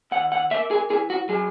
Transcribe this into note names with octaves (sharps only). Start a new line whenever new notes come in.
D#2 F#5
F#5
A#3 E5
G#4
E3 G#4
F#4
F#3 G#4